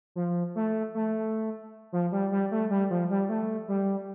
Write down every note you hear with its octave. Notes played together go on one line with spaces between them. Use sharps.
F3
A3
A3
F3
G3
G3
A3
G3
F3
G3
A3
G3